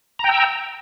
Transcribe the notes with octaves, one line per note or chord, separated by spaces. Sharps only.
G5 A#5 E6